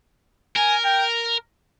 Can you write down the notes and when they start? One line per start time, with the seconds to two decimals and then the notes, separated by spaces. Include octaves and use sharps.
0.56 A#4 G#5
0.84 G5